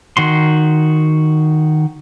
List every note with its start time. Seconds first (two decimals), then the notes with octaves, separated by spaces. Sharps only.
0.17 D#3 F#4 C6